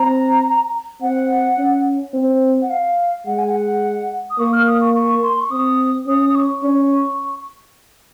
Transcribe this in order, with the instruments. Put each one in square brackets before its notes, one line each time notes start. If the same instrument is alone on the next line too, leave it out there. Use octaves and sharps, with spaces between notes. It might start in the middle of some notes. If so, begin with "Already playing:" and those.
Already playing: [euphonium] C4 [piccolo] A#5
[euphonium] C4 [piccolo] F#5
[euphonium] C#4
C4
[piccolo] F#5
F5
[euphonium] G#3 [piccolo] F#5
[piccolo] G#5
F#5
D#6
[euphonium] A#3 [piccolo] C#6
[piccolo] F6
D#6
C#6
C#6
C6
C#6
[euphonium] C4 [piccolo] D#6
[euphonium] C#4 [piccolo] D#6
[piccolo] D#6
C#6
[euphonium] C#4